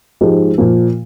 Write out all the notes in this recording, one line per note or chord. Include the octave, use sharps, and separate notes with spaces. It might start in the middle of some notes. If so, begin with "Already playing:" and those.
G#2 F3 G#3 D#4 G4
A#2 F3 A#3